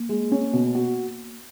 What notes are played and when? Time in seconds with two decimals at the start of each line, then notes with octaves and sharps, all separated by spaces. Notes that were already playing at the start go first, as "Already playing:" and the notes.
Already playing: A#3
0.09 G#3
0.32 C#4
0.53 B2
0.75 F#4